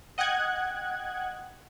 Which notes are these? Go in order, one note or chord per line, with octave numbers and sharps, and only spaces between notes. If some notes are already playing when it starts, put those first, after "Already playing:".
D#5 F#5 G5 F#6 G#6